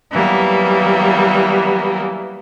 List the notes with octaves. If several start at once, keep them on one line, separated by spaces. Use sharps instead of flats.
E3 F#3 G3 A#3 B3